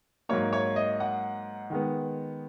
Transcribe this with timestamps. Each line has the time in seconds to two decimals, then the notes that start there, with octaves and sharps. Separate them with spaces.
0.29 G#2 F#3 A#3 C#5
0.53 C#5
0.76 D#5
1.00 F#5
1.70 D#3 G#3 B3